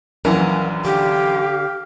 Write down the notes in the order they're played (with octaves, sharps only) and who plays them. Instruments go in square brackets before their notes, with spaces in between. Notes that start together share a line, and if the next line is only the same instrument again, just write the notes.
[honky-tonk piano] A#1 F#2 E3 [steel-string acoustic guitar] A#4 F5 F#5
[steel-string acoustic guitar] D3 [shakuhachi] G4 [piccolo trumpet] F5